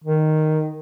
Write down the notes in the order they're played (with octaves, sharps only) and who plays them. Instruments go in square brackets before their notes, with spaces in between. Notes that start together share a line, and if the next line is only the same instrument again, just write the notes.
[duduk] D#3